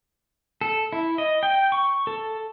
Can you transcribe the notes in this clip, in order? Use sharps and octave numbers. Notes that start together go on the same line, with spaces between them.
A4
E4
D#5
G5
C#6
A4